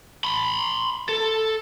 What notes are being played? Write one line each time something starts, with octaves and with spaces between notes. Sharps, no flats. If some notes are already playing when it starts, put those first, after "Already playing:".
B5 C6
A4